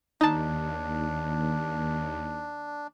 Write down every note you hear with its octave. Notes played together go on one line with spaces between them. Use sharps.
D#2 D4 D#4 A5